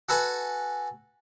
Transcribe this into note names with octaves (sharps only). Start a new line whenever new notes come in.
F#4 A4 B4 G#5